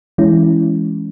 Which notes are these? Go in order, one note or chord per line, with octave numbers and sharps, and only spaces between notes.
E3 G#3 C#4 E4